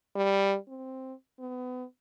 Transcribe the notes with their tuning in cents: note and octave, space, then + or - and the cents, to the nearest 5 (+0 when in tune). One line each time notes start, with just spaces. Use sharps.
G3 +5
C4 +0
B3 +30